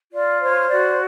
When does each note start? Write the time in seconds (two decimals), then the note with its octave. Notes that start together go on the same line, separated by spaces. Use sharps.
0.13 F4 D5
0.41 C5 C#5
0.69 F#4 D5